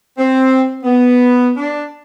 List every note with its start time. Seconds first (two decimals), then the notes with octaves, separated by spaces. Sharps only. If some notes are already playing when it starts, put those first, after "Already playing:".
0.18 C4
0.84 B3
1.57 D4